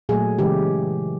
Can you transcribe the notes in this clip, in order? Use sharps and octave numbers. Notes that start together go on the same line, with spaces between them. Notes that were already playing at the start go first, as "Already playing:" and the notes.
A#2 F#3 A3 G#4
C#3 E3 G#3 G4